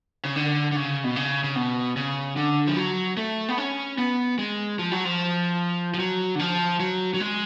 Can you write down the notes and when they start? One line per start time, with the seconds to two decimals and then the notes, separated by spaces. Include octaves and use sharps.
0.25 C#3
0.36 D3
0.72 D3
0.76 C#3
1.04 B2
1.16 C#3
1.44 C#3
1.56 B2
1.96 C#3
2.36 D3
2.67 F3
2.77 F#3
3.17 A3
3.49 B3
3.58 C#4
3.98 B3
4.38 G#3
4.79 F3
4.92 F#3
5.05 F3
5.94 F3
5.99 F#3
6.35 D3
6.39 F3
6.80 F#3
7.14 F#3
7.20 G#3